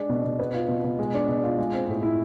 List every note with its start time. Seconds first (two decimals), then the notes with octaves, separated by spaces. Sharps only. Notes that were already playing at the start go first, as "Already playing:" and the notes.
Already playing: G#3 D4
0.09 B2
0.24 B2
0.39 B3
0.54 F4
0.68 B2
0.84 B2
0.99 G#3
1.14 D4
1.28 B2
1.44 F4
1.58 G#3
1.74 C4
1.88 A2
2.03 E4